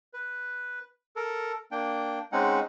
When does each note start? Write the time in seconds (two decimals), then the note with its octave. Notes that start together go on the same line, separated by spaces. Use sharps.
0.14 B4
1.16 A4 A#4
1.72 A#3 D4 G5
2.32 G#3 C4 C#4 D#4 F#5